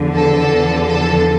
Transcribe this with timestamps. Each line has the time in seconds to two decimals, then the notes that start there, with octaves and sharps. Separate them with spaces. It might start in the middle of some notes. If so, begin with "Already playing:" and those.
Already playing: E2 D3 F3
0.15 A4
0.87 A4